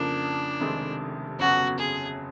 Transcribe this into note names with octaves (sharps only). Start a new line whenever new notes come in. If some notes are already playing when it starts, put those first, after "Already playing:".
Already playing: F2 C#3 F3 A#3 D4
F1 F2 C3 D#3 G#3
G1 F2 C#3 F#3 B3 F#4
G#4